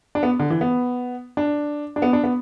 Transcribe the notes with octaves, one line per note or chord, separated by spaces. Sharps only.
D4
B3
D3
E3
B3
D4
D4
B3
D4
B3